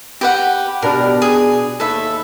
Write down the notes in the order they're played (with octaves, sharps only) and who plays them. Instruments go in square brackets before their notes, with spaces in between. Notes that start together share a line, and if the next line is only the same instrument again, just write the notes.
[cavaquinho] G4 B4 F#5
[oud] B2 D4 G4 [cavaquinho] A#4
[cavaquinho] G#4
[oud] D#2 [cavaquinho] A4 B4 E5